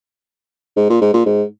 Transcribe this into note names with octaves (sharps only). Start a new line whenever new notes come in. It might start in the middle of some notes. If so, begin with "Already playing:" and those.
G#2
A#2
G#2
A#2
G#2